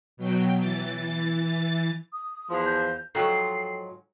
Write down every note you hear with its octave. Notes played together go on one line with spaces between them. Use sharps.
B2 F#3 G5
E3 A6
D#6
E2 F3
G6
G#2 F3 F#3 A4 G5 C7